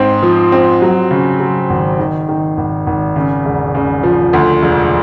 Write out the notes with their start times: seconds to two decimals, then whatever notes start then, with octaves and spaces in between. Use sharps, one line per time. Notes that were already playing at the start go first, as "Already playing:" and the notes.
Already playing: G#2 C4
0.23 F3
0.52 C4
0.82 F#3
1.11 C#3
1.40 F#3
1.70 G#1
1.99 D#3
2.29 D#3
2.57 G#1
2.87 G#1
3.16 C#3
3.46 E1
3.75 C#3
4.03 F3
4.33 D2
4.62 E1